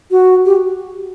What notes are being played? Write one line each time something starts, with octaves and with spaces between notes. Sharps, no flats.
F#4
G4